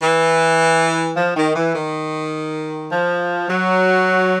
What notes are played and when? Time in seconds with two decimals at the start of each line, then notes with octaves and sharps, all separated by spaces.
0.02 E3
1.16 F3
1.36 D#3
1.56 E3
1.75 D#3
2.91 F3
3.48 F#3